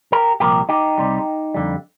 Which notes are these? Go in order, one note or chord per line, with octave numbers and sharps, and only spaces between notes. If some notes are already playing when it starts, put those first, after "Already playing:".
G4 A#4
C2 A#2 F3 G4 A#4
D#4 G4
C2 C3 G3
F2 D3 G3